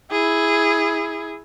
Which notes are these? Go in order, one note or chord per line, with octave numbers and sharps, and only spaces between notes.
E4 G#4